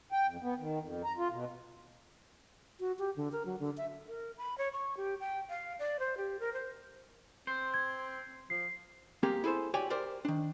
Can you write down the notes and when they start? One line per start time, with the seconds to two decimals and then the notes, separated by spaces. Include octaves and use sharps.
0.12 G5
0.28 F2
0.42 B3
0.59 D#3
0.79 F2
1.04 A#5
1.18 F4
1.30 B2
2.80 F#4
2.99 G4
3.16 D3
3.32 A#4
3.46 F#3
3.59 D3
3.77 E5
4.08 A#4
4.38 B5
4.58 C#5
4.73 C#6
4.97 G4
5.20 G5
5.50 F5
5.79 D5
5.99 C5
6.17 G4
6.40 A#4
6.54 C5
7.47 C4 C5
7.74 G#6
8.50 F3 C7
9.23 A#3 C4 G4 G#4 A#4
9.44 E4 G#4 A4 C5
9.74 F#4 G4 C#5 D5 G5 G#5
9.90 G4 A#4 C5 D5
10.25 D#3 D4